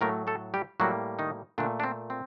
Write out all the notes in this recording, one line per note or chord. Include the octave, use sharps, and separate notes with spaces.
A2 F#3 A3 A#3 A#4
A3 A4
G3 G4
A2 F#3 G3 A#3 F#4
D#3 D#4
A#2 D3 A3 D4
D4
C4
C4